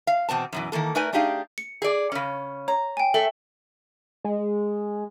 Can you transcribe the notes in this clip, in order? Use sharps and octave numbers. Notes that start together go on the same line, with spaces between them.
F5
E2 B2 C4 A5
F#2 B2 E3
D#3 E3 A#3 A4
A3 D#4 A#4 B4 D5 G#5
A3 D4 D#4 G4 G#4 F5
C#7
G#4 D5
C#3 C#4
C#5 A#5
G5 G#5
A3 A4
G#3